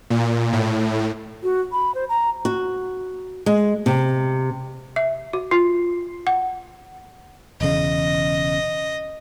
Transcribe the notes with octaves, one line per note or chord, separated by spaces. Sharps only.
A#2
A2
F#4
B5
C5
A#5
F#4
G#3
C3
E5
F#4
F4
F#5
E1 E2 C#3 D#5